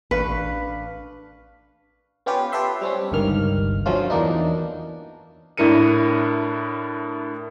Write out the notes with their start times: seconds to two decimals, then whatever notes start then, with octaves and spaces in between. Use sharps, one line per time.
0.11 A1 D4 B4 F5 C#6
2.26 B3 C#4 F4 G4 B4
2.52 G4 A4 B4 E5 C6
2.81 G3 C4 C#4
3.12 G1 C#2 G2 D#3 A#3 F6
3.86 D3 F3 F#3 A3 C#4 F4
4.10 E2 E3 A#3 D4 D#4
5.57 A2 D4 E4 A#4 C#7 D#7